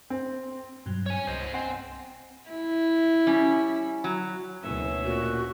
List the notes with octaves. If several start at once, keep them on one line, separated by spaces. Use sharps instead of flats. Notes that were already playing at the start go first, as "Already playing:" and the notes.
C4
G2 B2 F#3
C#5 G#5
C2 C5 D#5 A#6
C4 F#5 G#5 C6
E4
G3 C#4
F#3
F#1 D2 B2 C#4 E5
A#2 F#4